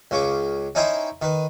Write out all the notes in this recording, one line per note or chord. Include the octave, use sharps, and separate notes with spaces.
C#2 C#3 C#6 D6
C#4 D#4 E4 C5 E5 G5
D#3 B4